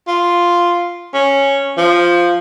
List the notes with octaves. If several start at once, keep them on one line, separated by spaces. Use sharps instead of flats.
F4
C#4
F3